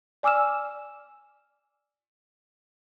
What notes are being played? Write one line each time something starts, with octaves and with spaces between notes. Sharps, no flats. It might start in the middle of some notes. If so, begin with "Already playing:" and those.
D5 G#5 D6 E6 F6 E7